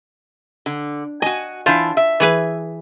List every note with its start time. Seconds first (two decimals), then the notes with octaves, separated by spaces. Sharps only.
0.66 D3
1.22 F#4 D#5 G#5
1.66 E3 D4 F4 C5
1.97 E5
2.20 E3 G#4 B4